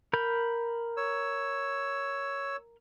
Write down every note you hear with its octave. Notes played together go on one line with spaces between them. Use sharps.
A#4 B5 G6
C#5 E6